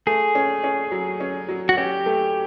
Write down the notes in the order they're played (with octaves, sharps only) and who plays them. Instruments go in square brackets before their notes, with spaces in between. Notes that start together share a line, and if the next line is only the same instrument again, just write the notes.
[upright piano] A3 [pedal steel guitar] G#4
[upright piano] C#4
C#4
F#3
C#4
F#3
[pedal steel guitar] F#4
[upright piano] C#4 [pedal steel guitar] G4
[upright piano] A3